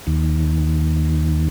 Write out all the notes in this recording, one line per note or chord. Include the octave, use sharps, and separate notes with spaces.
D#2